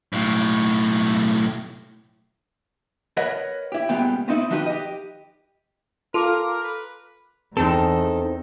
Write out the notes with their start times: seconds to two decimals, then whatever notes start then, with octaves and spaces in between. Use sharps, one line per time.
0.13 B1 A2
3.17 A#4 B4 C#5 D#5 F#5
3.72 E4 G4
3.89 A#2 C#3 G3 G#3 B3 G5
4.28 B3 C4 D#4 E4
4.50 D#3 F3 D#4 F#4 G4 B4
4.66 G4 D#5
6.14 F4 A4 A#4 C6 D6
6.64 B4
7.57 E2 C4 D#4 A4